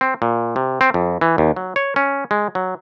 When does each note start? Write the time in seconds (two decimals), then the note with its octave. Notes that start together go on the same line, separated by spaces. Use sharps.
0.01 C4
0.22 A#2
0.56 C3
0.81 C4
0.94 F2
1.21 E3
1.38 D#2
1.56 F#3
1.76 C#5
1.96 C#4
2.31 G#3
2.55 F#3